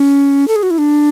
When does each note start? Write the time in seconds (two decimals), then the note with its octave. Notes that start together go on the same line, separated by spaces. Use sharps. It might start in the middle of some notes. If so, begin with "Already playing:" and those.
Already playing: C#4
0.48 A4
0.56 G#4
0.63 F#4
0.70 E4
0.78 D4